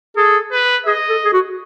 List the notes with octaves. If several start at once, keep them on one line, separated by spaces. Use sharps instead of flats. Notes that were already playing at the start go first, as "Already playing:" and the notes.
G#4 A4
B4
G#4 D#5
A4
G#4
F#4